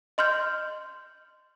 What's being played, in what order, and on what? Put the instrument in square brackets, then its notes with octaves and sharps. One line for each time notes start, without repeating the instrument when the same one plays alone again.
[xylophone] D#5 C6 F6 G6